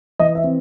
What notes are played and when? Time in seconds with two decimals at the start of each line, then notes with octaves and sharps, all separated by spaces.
0.20 E3 D#5
0.35 E5
0.44 C4